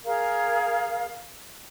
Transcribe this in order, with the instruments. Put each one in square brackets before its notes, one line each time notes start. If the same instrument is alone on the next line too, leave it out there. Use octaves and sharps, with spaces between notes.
[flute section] G#4 A#4 F5